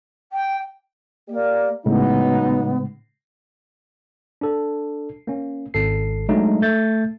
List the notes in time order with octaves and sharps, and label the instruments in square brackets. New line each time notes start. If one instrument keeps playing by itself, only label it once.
[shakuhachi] G5
[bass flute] A#3 [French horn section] G4 D5
[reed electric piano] A2 C#3 G#3 [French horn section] F#3 D#4 [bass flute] B3
[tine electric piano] D4 A4
A#3 C#4
G#1 A4 C7
F#3 G#3 A3 D4 D#4
A3 G6 A6